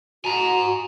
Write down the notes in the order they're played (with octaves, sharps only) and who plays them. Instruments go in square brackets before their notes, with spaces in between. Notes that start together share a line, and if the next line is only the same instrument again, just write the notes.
[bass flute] F#4 [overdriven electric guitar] G#5 A#5